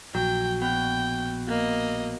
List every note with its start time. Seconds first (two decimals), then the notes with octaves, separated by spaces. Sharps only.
0.15 A#1 F#3 G5
0.62 B2 G5
1.48 A#3 D#5